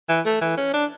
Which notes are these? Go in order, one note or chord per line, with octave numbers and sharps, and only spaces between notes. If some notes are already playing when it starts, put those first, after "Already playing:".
E3
A3
E3
C#4
D4